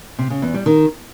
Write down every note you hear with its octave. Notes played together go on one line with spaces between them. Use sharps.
C3
C#3
E2
G3
D#3